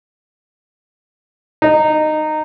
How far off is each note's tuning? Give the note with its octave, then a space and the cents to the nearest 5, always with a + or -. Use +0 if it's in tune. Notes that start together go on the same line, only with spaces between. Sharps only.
D#4 -15